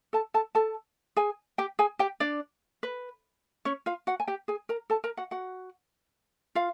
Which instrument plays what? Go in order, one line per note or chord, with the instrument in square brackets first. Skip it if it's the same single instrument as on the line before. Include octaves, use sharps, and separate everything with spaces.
[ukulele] A4 A5
A4 A5
A4 A5
G#4 G#5
G4 G5
G#4 G#5
G4 G5
D4 D5
B4
C#4 C#5
F4 F5
F#4 F#5
G#5
G4 G5
G#4 G#5
A#4 A#5
A4 A5
A#4 A#5
F#4 F#5
F#4 F#5
F4 F5